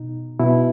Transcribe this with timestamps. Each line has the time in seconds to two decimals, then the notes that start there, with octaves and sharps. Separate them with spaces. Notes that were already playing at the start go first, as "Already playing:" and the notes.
Already playing: B2 D#4
0.39 B2 E4